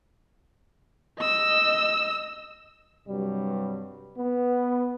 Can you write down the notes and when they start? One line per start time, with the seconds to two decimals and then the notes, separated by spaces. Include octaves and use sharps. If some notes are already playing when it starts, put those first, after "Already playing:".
1.19 D#5 E6
3.08 G2 C3 F#3 G3
4.17 B3